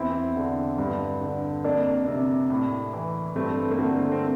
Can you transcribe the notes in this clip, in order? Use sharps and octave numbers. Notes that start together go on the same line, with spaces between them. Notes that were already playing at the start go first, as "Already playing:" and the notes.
Already playing: E2 C4 E4
D3
G2
D3
F2 A#3 D4
C3
A2
E3
G2 A3 C4
A#3
D3 A3 C4
C4